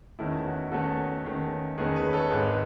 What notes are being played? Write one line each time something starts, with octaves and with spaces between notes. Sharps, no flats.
E2 D#3 A3 C#4 E4
F#4
E2 D#3 A3 C#4 F#4 A4
E2 D#3 A3 C#4
E2 D#3 A3 C#4 G#4 B4
G#4 B4
A4 C#5
G#1 G#2 D#3 G#4 B4